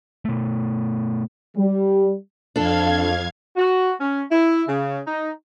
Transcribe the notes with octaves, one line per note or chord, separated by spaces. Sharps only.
B2 A3
G3
F2 D4 A4 F5 G#6
F#4
C#4
E4
C#3
D#4